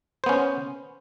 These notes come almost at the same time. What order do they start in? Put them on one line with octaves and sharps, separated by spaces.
C5 B3 C#4